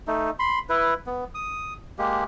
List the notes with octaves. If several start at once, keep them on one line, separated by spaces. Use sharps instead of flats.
A3 D#4
B5 C6
E4 B4
B3
D#6
G#3 A#3 G4